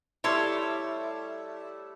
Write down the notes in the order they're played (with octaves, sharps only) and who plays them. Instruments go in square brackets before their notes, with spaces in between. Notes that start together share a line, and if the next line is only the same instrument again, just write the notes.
[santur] G3 A3 [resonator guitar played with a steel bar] E4 [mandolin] C#5 C6 D6